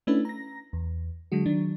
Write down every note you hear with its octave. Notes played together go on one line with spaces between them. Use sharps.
A3 C#4 D4 E4 B4
A#5 A#6
E2
D3 F#3 G#3 F#4
D#3 F#3 D4